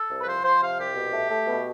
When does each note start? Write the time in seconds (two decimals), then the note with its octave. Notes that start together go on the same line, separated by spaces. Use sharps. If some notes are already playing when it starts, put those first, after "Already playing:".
Already playing: A4
0.09 C2
0.21 B4
0.26 F3 C5
0.43 F3 C5
0.61 C3 F5
0.78 C2 G4
0.96 B2
1.13 A3
1.30 A3
1.47 B2